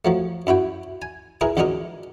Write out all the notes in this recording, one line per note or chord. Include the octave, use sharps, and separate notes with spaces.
F3 F#3 A3
F#2 E4 F#4 G5
G#5
E4 G#4 A#4 B4
C#2 D#3 F#3 D4 D#4 A#4